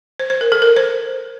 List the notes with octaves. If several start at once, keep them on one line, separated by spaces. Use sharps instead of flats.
C5
C5
A#4
A4
A#4
C5